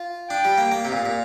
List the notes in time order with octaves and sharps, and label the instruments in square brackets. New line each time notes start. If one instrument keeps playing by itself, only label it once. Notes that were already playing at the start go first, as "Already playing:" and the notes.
Already playing: [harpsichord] F4
[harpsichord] D4 [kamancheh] G5
[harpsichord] G3
A#3
A#3
[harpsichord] C3 [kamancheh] F5
[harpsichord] A#2
A#2